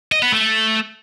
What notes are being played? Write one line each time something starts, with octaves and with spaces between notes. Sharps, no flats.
D#5
B3
A3